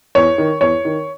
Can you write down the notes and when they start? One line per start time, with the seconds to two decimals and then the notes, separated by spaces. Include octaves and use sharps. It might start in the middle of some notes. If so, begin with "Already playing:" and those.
0.15 E2 C#5
0.38 D#3
0.61 E2 C#5
0.85 D#3